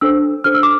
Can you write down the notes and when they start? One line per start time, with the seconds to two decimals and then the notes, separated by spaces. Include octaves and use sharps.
0.01 D4 A4 C5 E6
0.44 D4 A4 C5 F6
0.54 E6
0.63 D6